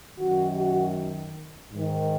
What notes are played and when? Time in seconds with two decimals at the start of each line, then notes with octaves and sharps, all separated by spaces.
0.15 F#2 D#3 F#4
0.55 F#4
1.73 G#2 D#3